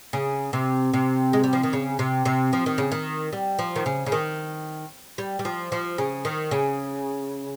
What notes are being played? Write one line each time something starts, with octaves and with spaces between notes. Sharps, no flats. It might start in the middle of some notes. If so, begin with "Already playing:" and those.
C#3
C3
C3
G#3
G3
F3
D#3
C#3
C3
C3
F3
D#3
C#3
D#3
G3
F3
D#3
C#3
C#3
D#3
G3
G3
F3
F3
C#3
D#3
C#3